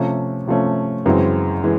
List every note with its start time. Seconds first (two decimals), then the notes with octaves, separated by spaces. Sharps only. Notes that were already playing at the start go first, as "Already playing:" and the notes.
Already playing: C3 F3 A3 C#4
0.47 C3 F3 A3 C#4
1.06 F#2 C#3 E3 G#3 C4
1.64 E3 G#3